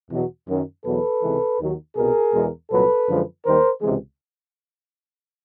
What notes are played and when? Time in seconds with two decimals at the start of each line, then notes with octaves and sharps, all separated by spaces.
0.11 E2 B2 F#3
0.48 F#2 D#3 F#3
0.85 E2 B2 F#3 A4 B4
1.22 C#2 C3 E3 G#3
1.59 D#2 D#3 F#3
1.96 C2 B2 G3 G#4 A#4
2.34 E2 B2 G#3
2.70 C2 A#2 F#3 A4 B4
3.08 F#2 D3 F3 G#3
3.45 D#2 D#3 G3 A#4 C5
3.82 C#2 C3 E3 G#3